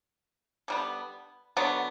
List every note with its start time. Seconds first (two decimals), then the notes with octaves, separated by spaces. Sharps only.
0.68 D3 G3 B3
1.57 D3 F#3 B3